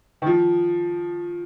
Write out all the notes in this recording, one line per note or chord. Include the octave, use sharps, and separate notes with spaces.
D#3
F3